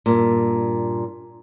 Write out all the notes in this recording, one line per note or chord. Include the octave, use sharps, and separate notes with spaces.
G2 A#2